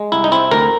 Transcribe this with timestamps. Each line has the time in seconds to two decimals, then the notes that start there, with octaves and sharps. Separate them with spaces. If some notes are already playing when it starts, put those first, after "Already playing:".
Already playing: G#3
0.12 C2 E4
0.24 D#4
0.32 C4 E4
0.51 D2 A#4